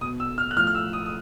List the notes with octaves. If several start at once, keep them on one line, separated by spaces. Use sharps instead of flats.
B2 D#6
E6
F6
F#6
A2 F3 F6
F6
E6
D#6
D#6